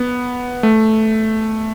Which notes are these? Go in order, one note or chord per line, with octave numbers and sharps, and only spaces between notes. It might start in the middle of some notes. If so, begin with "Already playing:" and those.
Already playing: B3
A3